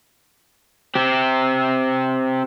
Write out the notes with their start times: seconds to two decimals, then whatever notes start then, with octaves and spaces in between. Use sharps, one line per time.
0.95 C4 G4